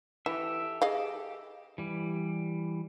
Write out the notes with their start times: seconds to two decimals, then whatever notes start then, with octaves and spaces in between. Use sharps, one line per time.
0.26 E3 G4 A4 E5
0.82 G#4 D#5 F5
1.78 E3 G3